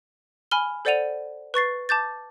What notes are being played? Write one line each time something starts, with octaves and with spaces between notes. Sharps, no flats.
G#5 B5 F6 G7
A4 C5 D5 F#5 D#7 F7
B4 C#6 A6 C7
A5 D6 G6 A6